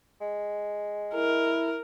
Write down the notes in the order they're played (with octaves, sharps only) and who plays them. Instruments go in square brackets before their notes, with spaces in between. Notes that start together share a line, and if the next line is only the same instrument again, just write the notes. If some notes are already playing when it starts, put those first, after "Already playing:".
[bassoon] G#3
[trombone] E4 [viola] A#4